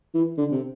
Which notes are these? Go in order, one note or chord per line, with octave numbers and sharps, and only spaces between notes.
E3
D3
C3